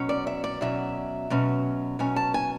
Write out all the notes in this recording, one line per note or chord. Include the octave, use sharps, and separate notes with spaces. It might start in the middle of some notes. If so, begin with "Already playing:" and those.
Already playing: B2 F#3 C#4
D5
E5
D5
B2 F#3 C#4 E5
B2 F#3 C#4
B2 F#3 C#4 G#5
A5
G#5